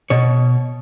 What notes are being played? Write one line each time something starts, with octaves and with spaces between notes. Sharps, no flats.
B2 C#5